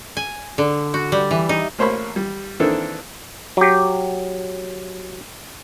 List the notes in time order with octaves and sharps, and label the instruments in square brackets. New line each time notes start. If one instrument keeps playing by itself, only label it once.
[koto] G#5
D3
F#4
G3
E3
D#4
[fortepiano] A1 A#3 C5 C#5 B5 C#6
G3
D#3 E3 A#3 C4 D4 A4
[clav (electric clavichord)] F#3 G4